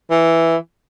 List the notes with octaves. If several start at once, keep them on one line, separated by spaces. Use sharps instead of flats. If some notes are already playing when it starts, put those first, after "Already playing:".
E3